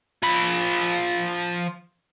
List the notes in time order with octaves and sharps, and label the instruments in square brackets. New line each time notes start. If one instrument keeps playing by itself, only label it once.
[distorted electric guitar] F3 B5